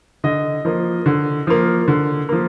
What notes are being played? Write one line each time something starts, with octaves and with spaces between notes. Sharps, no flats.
D3 D#5
F3 A#3
D3
F3 A#3
D3
F3 A#3